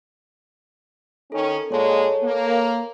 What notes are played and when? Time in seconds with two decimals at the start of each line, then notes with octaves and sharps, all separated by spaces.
1.32 D#3 C#4 A4
1.70 A#2 G#3 A4 C#5 A5
2.23 A#3